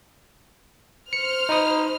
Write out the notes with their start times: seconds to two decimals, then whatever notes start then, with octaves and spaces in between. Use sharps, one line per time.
1.13 C5 F6 C#7
1.49 D#4 B5 D#6